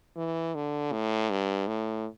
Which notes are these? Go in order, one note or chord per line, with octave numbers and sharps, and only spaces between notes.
E3
D3
A2
G2
A2